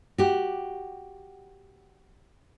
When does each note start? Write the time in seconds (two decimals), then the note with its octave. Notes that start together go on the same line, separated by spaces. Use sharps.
0.18 F#4 G4